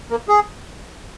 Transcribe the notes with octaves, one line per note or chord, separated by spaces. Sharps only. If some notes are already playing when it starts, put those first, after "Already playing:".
A#3
G#4